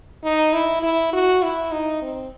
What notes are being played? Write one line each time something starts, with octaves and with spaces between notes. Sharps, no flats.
D#4
E4
E4
F#4
E4
D#4
C4